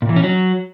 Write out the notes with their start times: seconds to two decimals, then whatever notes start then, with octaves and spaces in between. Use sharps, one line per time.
0.02 A#2
0.09 E3
0.16 C#4
0.24 F#3